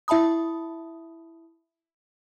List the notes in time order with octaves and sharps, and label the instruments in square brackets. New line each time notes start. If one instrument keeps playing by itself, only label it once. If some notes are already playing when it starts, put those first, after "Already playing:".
[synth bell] E4 E5 A5 B5 D#6